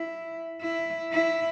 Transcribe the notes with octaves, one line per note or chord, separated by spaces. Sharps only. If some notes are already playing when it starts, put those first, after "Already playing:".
Already playing: E4
E4
E4